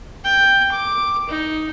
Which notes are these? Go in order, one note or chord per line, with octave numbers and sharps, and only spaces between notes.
G5
D6
D#4